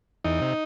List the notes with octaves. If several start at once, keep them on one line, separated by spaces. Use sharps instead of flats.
E2 D#4
C3